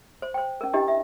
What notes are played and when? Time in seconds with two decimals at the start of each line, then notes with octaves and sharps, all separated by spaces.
0.22 C5
0.34 C5 G5
0.61 C#4 A#4
0.73 D4 E4 G4 D#5 G5
0.88 E5